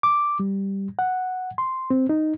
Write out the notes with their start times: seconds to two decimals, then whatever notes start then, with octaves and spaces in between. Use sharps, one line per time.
0.03 D6
0.40 G3
0.99 F#5
1.58 C6
1.90 C4
2.09 D#4